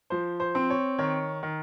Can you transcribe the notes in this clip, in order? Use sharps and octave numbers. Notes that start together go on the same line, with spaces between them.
F3 C5
C5
C4
C#5
D#3 C#5
D#3